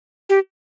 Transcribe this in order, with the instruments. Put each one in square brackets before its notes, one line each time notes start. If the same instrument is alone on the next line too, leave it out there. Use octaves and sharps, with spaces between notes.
[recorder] G4